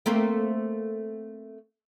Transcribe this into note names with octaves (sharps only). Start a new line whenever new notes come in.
A3 A#3 C4